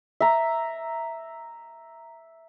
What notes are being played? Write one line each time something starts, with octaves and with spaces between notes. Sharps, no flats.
E5 A#5